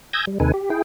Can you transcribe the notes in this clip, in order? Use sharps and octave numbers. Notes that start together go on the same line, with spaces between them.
G#5 D#6 E6 G6 G#6 A#6
G3
D#2 C3 D#4 A4 B4 G#5
G4
E4 G#4 G5